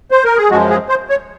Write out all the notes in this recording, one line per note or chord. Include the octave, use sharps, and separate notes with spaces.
C5
A#4
G#4
F#2 F3 G#3 F#4
G#4
C5
C#5